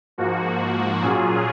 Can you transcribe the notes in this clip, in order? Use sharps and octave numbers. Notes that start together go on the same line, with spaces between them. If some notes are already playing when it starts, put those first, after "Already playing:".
G#2 F3 A#3 F#4
A#2 F#3 C#4 F4 G#4